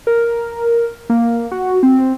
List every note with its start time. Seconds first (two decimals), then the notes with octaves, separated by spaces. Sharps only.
0.07 A#4
1.10 A#3
1.52 F#4
1.83 C4